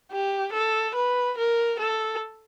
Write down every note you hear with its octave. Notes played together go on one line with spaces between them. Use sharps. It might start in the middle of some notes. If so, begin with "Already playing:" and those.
G4
A4
B4
A#4
A4